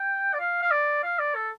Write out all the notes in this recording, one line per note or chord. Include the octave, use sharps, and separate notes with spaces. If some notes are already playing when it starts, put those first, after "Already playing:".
Already playing: G5
D5
F5
F5
D5
F5
D5
A4